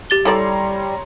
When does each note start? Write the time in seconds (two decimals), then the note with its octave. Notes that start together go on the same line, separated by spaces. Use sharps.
0.10 G4 A6 G7
0.25 G3 E4 A4 C#5 D5 A#5 C6